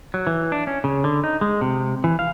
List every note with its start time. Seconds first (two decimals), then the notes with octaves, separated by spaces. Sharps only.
0.14 F#3
0.27 E3
0.52 D4
0.67 C#4
0.84 C#3
1.04 D3
1.24 D#4
1.41 G#3
1.61 C3
2.04 E3
2.19 F5